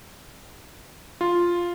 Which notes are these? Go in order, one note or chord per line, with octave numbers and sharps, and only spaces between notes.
F4